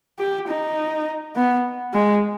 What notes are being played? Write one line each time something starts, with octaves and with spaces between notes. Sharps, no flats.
G4
D#4
B3
G#3